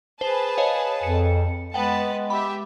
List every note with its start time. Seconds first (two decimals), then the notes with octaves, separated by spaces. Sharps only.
0.21 G#4 B4 C5 A5
0.58 C#5 D#5 F5
1.03 F2 C#7
1.74 G#3 B3 B4 F#5 G5 A5
2.30 G4 E5 B5